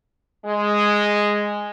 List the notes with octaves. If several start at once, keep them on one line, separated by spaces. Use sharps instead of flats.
G#3